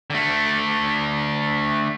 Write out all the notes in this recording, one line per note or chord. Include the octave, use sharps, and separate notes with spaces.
D3 A3